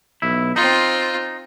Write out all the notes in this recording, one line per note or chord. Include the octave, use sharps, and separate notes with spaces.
B1 E4
C4 D#4 F4